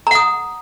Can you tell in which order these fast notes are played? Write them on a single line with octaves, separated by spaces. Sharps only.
A#5 F#5 D#6